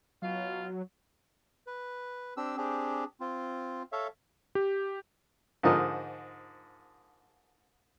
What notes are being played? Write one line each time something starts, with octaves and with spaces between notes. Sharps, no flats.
B2 F#3 F4
B4
C4 D4 G4 E6
C4 D4 G4 G#4
C4 F4
A4 C#5 E5 F5
G4
G#2 D3 F3 A#4 D#5